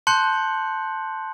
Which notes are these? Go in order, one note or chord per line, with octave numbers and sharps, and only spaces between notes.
A5 C6 F#6 G6 C#7 F#7